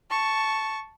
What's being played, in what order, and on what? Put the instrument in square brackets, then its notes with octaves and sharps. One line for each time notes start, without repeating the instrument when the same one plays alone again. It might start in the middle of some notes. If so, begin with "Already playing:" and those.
[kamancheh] A5 C#6